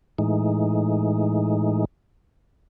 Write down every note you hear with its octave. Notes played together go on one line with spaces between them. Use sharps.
A2 E3 G#3 D#4